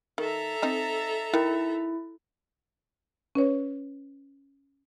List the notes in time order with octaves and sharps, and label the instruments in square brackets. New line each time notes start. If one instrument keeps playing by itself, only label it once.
[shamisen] D#3 [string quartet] A4 E5 A#5
[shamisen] C4 D#4 D#5
[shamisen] D#3 [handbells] E4
[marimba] C#4 B4 C#5